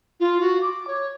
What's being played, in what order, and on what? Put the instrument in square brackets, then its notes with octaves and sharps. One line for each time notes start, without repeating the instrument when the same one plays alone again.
[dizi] F4
F#4
D6
C#5